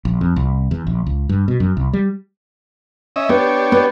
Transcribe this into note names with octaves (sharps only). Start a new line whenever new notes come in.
A#1
F2
C2
E2
A#1
C#2
G2
B2
F#2
C2
G3
C#4 D#5 E5
B3 D4 G4 C#5
B3